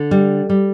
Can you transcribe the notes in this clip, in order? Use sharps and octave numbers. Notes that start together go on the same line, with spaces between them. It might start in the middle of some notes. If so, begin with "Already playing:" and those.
Already playing: D3
G3
G3